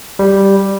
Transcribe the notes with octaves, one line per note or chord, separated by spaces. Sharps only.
G3